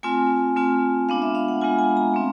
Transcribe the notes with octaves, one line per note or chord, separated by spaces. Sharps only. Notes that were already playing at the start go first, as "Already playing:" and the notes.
A3 C4 F4 G#5
A3 C4 F4
G#3 B3 D4 F4 F5
E5
F5
F#5
G#3 B3 D4 F4 G#5
G#5
A#5
A3 C4